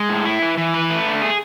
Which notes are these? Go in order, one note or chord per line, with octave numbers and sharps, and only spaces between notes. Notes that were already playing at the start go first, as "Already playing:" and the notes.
Already playing: G#3
A2
E4
E3
E3
B4
A3
D3
G#4